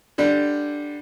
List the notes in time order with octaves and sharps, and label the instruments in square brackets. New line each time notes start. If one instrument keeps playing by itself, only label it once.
[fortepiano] D3 G3